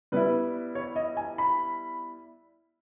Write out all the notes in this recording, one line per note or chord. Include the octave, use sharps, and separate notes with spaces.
G3 B3 E4 B4
C#5
D#5
G#5
B5